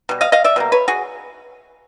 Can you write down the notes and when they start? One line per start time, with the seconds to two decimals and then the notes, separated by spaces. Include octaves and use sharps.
0.09 B2 G3
0.21 D#5 F5
0.32 D#5 F5
0.44 D5 E5
0.56 B2 G3 A#3
0.72 B4 C#5
0.88 F#4 G#4